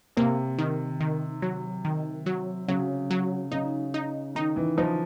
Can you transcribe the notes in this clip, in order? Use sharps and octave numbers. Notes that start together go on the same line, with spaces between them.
C3 A#3
D#3
D#3
F#3
D#3
F#3
C#3 F#3
F#3
C#3 D#4
D#4
D#3 D#4
E3
F3 D#4